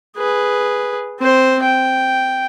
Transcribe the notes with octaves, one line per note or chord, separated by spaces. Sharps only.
G#4 B4
C4 C5
G5